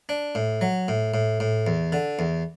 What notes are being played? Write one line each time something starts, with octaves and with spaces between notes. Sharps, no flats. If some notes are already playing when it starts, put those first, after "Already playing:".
D4
A2
F#3
A2
A2
A2
E2
D3
E2